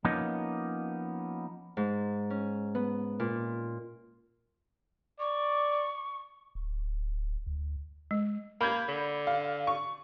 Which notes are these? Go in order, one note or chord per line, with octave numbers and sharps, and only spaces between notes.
F3 A#3 B3 C#4 D#4
G#2
C#4
B3
A#2
D5 C#6
D1
D2
G#3
A#3 B5 G6 G#6
D3
F5
C#6